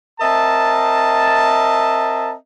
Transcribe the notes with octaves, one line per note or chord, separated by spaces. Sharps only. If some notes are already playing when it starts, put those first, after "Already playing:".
C4 A#4 D#5 E5 A5